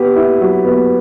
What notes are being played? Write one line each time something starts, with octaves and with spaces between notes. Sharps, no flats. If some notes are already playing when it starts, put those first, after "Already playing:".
Already playing: B3 G4
E4
F#3
B3